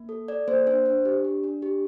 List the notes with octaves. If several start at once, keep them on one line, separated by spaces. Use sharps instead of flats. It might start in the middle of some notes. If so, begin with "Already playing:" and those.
Already playing: A#3
A4
A4 D5
A#3 C5
D4 C5
D4
G4
D4
D4
G4